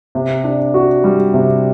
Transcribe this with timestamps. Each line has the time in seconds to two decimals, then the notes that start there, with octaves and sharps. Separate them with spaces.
0.15 C3
0.44 D4
0.74 F#4
1.04 G3
1.34 C3